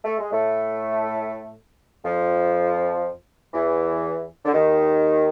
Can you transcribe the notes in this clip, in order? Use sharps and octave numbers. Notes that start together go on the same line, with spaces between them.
A3
G#3
A2 A3
F2 F3
E2 E3
D3
D#2 D#3